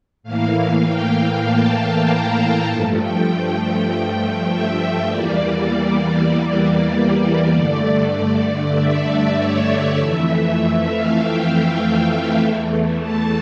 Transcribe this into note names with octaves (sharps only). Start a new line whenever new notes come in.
A2 E3 A#3 F5
G5
G5
A5
A#5
G2 F3 A3 A5
G5
G5
E5
E2 E3 G3 A#3 D5
D5
G2 D3 A3 D5
E5
D5
C#5
D5
F2 E3 A3 E5
E5
F5
G5
G5
E2 E3 A3
A5